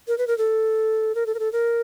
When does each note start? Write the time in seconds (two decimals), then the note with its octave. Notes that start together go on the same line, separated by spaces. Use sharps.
0.08 A#4
0.18 B4
0.27 A#4
0.38 A4
1.15 A#4
1.26 A4
1.35 A#4
1.39 A4
1.53 A#4